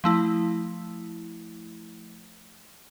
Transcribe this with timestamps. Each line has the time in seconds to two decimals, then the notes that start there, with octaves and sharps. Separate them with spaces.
0.04 F3 A3 E4